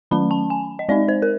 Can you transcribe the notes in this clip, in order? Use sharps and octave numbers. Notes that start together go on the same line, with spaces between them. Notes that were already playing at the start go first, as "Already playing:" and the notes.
D#3 F#3 A3 C#4 B5
A5
G#5
D#5
G#3 C4 D#4 D5
C5
A#4